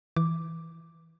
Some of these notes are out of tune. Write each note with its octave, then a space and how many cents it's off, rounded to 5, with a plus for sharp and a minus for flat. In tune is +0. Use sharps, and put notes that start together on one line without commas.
E3 -10 D6 +0